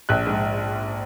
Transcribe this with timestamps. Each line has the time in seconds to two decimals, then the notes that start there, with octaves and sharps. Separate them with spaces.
0.09 A#1 F#6
0.27 G#2